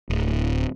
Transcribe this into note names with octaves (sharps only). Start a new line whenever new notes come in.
D1